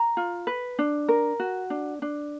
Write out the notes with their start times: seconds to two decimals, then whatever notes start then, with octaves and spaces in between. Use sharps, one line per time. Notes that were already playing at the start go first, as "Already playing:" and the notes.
Already playing: A#5
0.17 F4
0.47 B4
0.79 D4
1.08 A#4
1.40 F#4
1.70 D4
2.02 D4